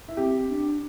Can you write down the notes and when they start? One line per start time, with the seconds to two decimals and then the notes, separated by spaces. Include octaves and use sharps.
0.08 E4
0.17 C4 G4
0.49 D4